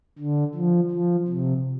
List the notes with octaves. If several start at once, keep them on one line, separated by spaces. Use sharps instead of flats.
D3
F3
F3
C3